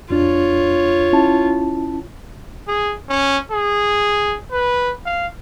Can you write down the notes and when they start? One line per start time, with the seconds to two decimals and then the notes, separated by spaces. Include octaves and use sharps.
0.10 F2 D4 F4 C#5
1.13 C#4 E4 A5
2.68 G#4
3.09 C#4
3.52 G#4
4.52 B4
5.06 F5